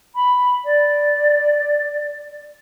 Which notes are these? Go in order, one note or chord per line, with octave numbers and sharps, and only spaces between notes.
B5
D5